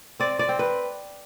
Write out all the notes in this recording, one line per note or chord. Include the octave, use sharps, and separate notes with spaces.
C4 D5
D5
C4
B4